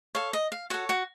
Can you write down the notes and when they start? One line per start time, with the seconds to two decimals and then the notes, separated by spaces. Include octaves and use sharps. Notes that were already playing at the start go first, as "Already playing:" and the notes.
0.15 A4 C#5 F5
0.33 D#5
0.52 F5
0.70 F#4 A4 C#5 F#5
0.89 F#4 F#5